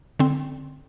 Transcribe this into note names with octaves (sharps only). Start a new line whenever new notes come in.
D3 C4